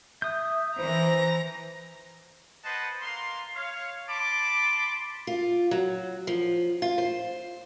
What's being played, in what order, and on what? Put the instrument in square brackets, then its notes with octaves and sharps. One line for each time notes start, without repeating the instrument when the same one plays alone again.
[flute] E5 [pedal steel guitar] D#6 G6
[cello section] E3 [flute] C5 [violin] A#5 A#6
[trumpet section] B4 C5 D#5 F#5 A5
A#3 F5 C6
C#5 F5
A5 B5 C6 D6
[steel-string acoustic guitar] F4
F#3
F3
F4
C5